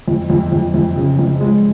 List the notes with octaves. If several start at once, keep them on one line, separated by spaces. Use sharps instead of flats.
F2
F2
F2
F2
C#3
F2
G#3